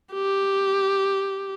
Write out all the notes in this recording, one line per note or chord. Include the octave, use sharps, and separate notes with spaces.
G4